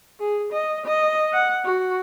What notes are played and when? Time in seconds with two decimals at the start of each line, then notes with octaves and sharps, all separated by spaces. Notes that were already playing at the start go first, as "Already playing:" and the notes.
0.20 G#4
0.53 D#5
0.86 D#5
1.33 F#5
1.65 F#4